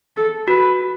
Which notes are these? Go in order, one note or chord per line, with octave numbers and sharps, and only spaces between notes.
A4
F#4 B4